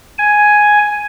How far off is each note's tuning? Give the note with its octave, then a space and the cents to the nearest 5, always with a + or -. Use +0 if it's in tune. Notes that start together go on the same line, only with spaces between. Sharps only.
G#5 +5